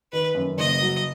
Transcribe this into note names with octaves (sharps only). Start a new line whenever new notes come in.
D#3 B4
F#2
F#1 D#5
F#3